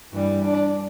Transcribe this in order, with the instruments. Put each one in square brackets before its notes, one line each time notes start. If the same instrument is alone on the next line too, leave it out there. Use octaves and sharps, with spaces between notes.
[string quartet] G2 E3 G3
D4